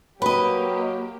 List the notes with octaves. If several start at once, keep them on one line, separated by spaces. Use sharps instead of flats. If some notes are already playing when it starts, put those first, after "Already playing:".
F#3 A#3 G4 B4 D#5 B5